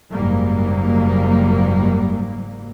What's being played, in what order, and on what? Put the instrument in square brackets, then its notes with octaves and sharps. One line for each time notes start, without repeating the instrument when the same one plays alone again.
[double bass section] F#1 G#2 F#3 G3 A#3